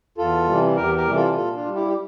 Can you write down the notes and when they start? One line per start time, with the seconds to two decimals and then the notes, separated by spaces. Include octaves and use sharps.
0.18 E2 F4 A4
0.47 C3 E3 G3
0.76 E2 G4 A#4
0.96 G4 A#4
1.06 C3 E3 G3
1.16 F4 A4
1.35 A#2 F4 A4
1.55 D4 F4
1.66 G3
1.75 E4 G4
1.88 G4